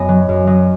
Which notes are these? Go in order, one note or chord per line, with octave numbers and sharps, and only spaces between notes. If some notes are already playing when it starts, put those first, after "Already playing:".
Already playing: F#2 B3 D#5 G#5 B5
F#3
F#2
F#3 D#5